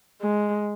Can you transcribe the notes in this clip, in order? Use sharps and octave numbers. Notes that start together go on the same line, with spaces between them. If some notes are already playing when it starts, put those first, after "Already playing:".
G#3